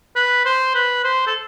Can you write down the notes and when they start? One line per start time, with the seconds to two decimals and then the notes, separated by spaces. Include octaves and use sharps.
0.16 B4
0.45 C5
0.75 B4
1.04 C5
1.27 A4